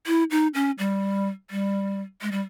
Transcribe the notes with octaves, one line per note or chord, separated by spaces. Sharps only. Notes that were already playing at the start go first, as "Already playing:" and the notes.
E4
D#4
C#4
G3
G3
G#3
G3